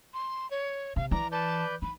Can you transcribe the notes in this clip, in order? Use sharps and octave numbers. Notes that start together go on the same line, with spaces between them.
C6
C#5
C3 F5
E3 D5 A#5
B4 D5 A5 G6
D#4 B5